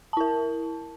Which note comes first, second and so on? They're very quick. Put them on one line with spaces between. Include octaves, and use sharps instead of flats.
A5 E4 A#4